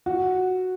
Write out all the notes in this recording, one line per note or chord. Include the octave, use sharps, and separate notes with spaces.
F#4